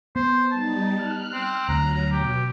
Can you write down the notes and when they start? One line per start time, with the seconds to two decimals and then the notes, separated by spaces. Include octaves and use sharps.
0.16 B3 C5
0.52 G3 D#4 A5
0.91 F6 F#6
1.33 C4
1.69 D2 F#3 A#5
2.12 B2 G4